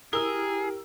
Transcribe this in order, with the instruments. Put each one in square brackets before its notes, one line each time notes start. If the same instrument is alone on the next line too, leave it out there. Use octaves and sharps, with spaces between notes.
[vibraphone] E4 [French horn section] G4 [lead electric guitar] G#4 [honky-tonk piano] A#4 E6